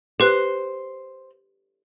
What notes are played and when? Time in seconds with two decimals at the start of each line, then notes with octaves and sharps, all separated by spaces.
0.20 G4 B4 C5 F#6